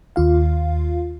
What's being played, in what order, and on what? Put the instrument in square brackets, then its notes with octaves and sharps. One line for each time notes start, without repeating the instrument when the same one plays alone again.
[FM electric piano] D#2 F4 F5